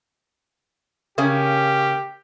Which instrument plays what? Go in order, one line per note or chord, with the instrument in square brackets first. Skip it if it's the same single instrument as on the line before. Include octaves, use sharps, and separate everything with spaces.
[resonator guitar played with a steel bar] C#3 A#3 C#4 [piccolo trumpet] G4